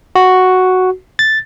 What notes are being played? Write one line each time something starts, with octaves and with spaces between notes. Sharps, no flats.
F#4
A6